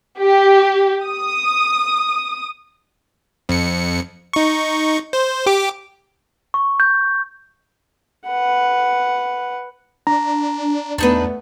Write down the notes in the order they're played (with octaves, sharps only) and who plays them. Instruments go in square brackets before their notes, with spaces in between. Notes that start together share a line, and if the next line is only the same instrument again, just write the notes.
[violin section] G4
D#6
[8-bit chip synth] F2 C#7
D#4 C#6
C5
G4 D6
[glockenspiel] C#6
G6
[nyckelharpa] B4 F#5
[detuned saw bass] D4 [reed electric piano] A#5
[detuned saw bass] E2 [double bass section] A3 B3 [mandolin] D4 D#4 B4